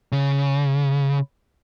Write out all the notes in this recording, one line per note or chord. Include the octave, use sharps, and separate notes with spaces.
C#3